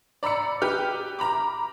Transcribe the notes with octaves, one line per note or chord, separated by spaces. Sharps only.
D5 A#5 B5 E6 C#7
G4 B4 F6
A#5 B5 D6